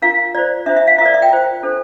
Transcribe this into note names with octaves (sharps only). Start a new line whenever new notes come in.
D4 F4 A#4 F5
F4 C5 D5
D4 F4 C5 E5
E5
F5
F4 A#4 D5 E5
E5
G5
F4 C5
D4 A4 C5